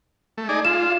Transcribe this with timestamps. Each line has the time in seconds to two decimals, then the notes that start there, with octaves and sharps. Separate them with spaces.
0.38 A3
0.49 D#4 G#4 D5
0.65 F4 E7